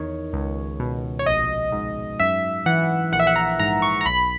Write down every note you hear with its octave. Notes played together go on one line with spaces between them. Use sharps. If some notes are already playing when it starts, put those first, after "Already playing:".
Already playing: E2 D#3 C#5
C#2
B2
C#5
A#1 D#5
G#2
F#2 E5
E3 F#5
A#1 F#5
E5
F#5
A#5
G#2 A#5
C#6
A#5
B1 B5